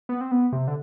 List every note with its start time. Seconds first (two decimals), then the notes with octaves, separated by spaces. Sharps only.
0.09 B3
0.21 C4
0.31 B3
0.52 C3
0.68 D3